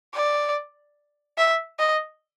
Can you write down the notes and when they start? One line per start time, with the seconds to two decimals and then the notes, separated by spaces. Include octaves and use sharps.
0.14 D5
1.38 E5
1.79 D#5